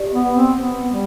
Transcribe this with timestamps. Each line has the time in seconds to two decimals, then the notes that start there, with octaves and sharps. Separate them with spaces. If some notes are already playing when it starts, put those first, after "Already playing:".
Already playing: G4 D5
0.13 B3
0.36 C4
0.59 B3
0.90 G3